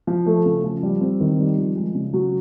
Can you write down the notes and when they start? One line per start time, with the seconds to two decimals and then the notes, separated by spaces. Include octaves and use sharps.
0.07 F3
0.26 A3
0.46 C#3
0.64 F3
0.83 G3
1.01 C4
1.20 D#3
1.39 G3
1.58 F3
1.76 G#3
1.95 C#3
2.13 F#3